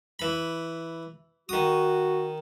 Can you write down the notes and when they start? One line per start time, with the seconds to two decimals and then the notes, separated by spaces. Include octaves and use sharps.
0.19 E3 B5
1.49 D#3 F#4 D#6